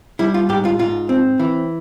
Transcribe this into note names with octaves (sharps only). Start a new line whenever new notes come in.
G3 E4
F4
G#2 G4
F4
G#2 F4
C4
E3